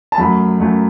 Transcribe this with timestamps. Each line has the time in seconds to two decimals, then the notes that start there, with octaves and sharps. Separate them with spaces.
0.12 A5
0.18 F#2 F#3 A3 B5
0.60 F#2 F#3 A3